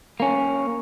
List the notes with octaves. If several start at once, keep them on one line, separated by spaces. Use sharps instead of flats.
A#3 C#4